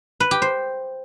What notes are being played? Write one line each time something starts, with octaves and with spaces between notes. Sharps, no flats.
B4
G4
C5